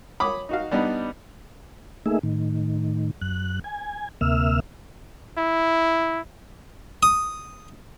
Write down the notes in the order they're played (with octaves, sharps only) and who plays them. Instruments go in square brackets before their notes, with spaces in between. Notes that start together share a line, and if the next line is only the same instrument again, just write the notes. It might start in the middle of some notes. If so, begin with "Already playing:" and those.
[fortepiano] C#5 B5 D6 D#6
D#4 F#4 F5
G3 B3 D4 D#4
[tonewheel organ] A3 A#3 D#4 G#4 E5
A2 D#3
F#2 F#6
G#5
D2 C3 A#3 E5 E6 F6
[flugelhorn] E4
[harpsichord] D#6